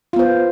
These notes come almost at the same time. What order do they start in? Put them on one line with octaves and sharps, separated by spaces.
F4 B3 C5